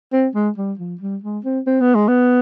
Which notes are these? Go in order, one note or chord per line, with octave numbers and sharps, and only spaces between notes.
C4
G#3
G3
F3
G3
G#3
C4
C4
B3
G#3
B3